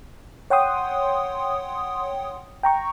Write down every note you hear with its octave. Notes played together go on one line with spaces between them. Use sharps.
C#5 F#5 G5 C6 D#6
G5 A#5 C#6